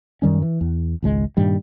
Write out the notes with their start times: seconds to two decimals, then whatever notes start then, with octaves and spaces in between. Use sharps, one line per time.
0.22 F#2 D#3 G3 C#4
0.42 E3
0.61 E2
1.02 G#1 C#2 G#3
1.37 G2 A#2 D#3 G3